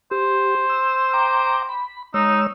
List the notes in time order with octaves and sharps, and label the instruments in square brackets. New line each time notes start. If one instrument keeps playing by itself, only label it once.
[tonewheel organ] G4 [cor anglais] C5
[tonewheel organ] E6
G5 A#5 D6
B5
[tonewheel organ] G#3 C#5 E6 [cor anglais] D#4